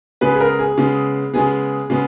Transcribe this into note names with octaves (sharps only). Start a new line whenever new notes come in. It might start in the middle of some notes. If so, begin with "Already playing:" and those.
C#3 G#3 B3 B4
G#4
A#4
G#4
C#3 G#3 B3
C#3 G#3 B3 G#4
C#3 G#3 B3